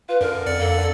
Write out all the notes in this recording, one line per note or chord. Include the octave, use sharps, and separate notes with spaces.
F4 B4
F#2 D3 A#4
F2 D5 C#7
A#3 A4
D3